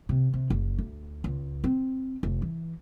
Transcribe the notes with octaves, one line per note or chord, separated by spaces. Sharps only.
C3
C3
F#1
D2
C#2
C4
F1
E3